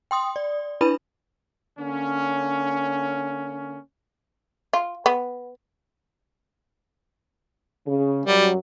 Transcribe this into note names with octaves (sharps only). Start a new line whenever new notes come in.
G5 C6 D#6
D5
D4 E4 B4 B5 D#7
D3 A#3 C#4
F4
B3
C#3
F#2 F#3 G3